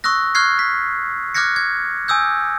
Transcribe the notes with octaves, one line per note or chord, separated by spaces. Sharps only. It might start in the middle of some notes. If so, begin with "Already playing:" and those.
C#6 D#6 E6 F#6 A#6
C#6 F6 F#6 G#6 C7
B6
D6 F6 F#6 G#6 A#6 C#7
G#6
G#5 D#6 E6 G6